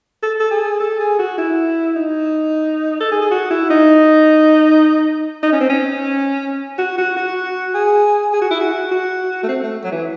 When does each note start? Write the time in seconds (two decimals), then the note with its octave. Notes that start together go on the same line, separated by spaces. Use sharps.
0.22 A4
0.40 A4
0.51 G#4
0.80 A4
0.99 G#4
1.19 F#4
1.38 E4
1.96 D#4
3.00 A4
3.11 G#4
3.22 G#4
3.31 F#4
3.50 E4
3.70 D#4
5.43 D#4
5.52 C#4
5.60 C4
5.69 C#4
6.78 F#4
6.98 F#4
7.16 F#4
7.74 G#4
8.33 G#4
8.41 F#4
8.51 E4
8.60 F#4
8.91 F#4
9.43 A3
9.49 C4
9.63 A3
9.83 F#3
9.92 E3